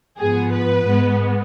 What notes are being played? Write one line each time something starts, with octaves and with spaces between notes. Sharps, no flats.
G#2 F3 B3 G#4
B4
G#2 G#3 B3